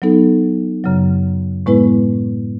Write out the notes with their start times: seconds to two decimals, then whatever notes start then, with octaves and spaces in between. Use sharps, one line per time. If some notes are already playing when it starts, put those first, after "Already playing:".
0.02 F#3 B3 D#4 A4
0.84 F#2 C#3 F#3
1.66 A2 G#3 B3 E4 B4